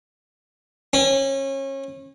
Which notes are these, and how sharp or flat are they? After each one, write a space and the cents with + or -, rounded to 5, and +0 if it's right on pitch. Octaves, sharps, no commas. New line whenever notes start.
C#4 -30